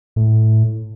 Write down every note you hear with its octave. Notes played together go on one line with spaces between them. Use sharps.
A2